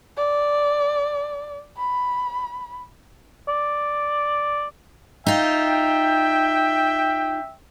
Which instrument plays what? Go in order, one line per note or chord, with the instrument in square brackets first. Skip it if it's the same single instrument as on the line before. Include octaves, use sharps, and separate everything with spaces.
[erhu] D5
B5
[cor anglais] D5
[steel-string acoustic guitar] D#4 F4 [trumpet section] E5 G5